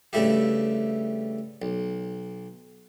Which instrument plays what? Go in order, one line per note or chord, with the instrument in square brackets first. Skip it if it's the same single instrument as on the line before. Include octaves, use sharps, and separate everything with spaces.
[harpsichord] G2 C#3 A3 E4 G4
B1